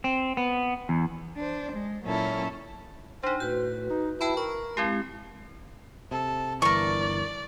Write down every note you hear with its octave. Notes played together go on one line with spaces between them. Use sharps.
C4
B3
E2
D4 C5
G#3
A#2 F#3 C#4 E4 A4
D4 D#4 C5
A2 F#4 B4 G6
D#4
E4 G5 A5 B5
A#4 C#6
G#3 C4 E4 G4
C3 A4
G1 E3 A#4 D5 C#6